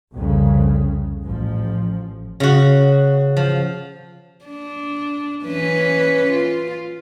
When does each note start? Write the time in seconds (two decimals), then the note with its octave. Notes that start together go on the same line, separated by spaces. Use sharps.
0.13 C2 F2 C#3
1.23 A1 F3
2.40 C#3 F#4
3.37 F3
4.45 D4
5.45 E3 C#4 B4
6.31 F4